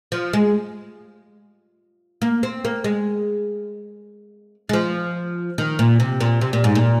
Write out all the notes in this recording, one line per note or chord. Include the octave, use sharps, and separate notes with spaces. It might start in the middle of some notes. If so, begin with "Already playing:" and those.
F3
G#3
A#3
C4
A#3
G#3
G#3
F3
D#3
A#2
C3
A#2
C3
A#2
G#2
A#2